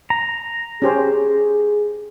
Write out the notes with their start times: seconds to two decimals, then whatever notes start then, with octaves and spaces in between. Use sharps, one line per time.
0.10 A#5
0.82 C#4 G4 G#4 C5